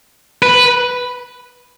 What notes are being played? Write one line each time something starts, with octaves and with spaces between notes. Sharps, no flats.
B4